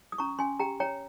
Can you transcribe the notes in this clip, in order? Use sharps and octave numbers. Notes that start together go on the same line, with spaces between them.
D#6
C#4 A#5 C#6
C#4 G#5 C6
G4 G5 A#5
C#5 G5 A#5